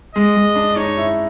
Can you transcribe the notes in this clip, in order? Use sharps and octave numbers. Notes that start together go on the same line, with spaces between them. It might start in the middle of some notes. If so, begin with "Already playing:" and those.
G#3 D#5
G#3
D4
D#4 C#5
E4